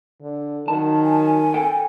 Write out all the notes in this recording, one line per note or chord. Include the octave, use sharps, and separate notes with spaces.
D3
D#3 F#3 A5
G#5
A4 G5